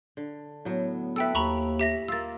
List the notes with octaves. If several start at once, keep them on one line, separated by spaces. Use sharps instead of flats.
D3
A2 F#3 B3
A4 B4 E5 G5 E6
D#2 A#5 B5 C#6
G4 E5 A#6
A#3 F4 E6 A6